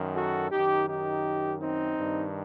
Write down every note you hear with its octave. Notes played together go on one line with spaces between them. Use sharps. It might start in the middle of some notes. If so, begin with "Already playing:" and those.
Already playing: F#2 D#3
F#4 A4
F#2 D#3 D#4 G4
D#4 G4
C4 D#4
G2 D#3